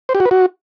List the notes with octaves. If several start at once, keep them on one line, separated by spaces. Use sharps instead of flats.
C5
G4
F#4
B4
F#4